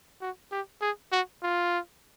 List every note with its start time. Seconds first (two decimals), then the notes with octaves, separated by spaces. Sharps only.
0.21 F#4
0.51 G4
0.81 G#4
1.12 F#4
1.42 F4